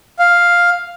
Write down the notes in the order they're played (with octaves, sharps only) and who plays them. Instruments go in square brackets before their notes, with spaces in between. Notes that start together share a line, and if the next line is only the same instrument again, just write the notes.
[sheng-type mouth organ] F5